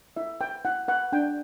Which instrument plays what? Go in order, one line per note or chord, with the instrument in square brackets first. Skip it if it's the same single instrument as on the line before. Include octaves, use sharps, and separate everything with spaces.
[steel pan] E4 E5
B4 G5
E4 F#5
B4 F#5
D4 G5